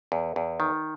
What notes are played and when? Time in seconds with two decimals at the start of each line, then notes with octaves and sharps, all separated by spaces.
0.12 E2
0.36 E2
0.60 D#3